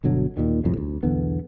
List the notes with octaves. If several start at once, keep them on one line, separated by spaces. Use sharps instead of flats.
G1 B2 D3 F#3
D#2 A#2 D#3
C2 F2 A2 C3
D2
B1 E2 D3 B3